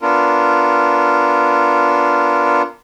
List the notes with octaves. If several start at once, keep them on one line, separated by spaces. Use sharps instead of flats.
B3 D4 F4 A#4